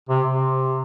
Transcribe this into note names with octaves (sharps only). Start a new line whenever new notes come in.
C3
C3